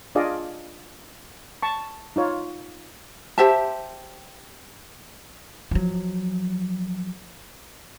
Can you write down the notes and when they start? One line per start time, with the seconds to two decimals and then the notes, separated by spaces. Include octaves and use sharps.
0.15 D4 F4 G#4 D5 D#5 F5
1.62 A5 C#6
2.16 D#4 F4 C#5
3.38 G4 C5 E5 A5
5.71 F3 F#3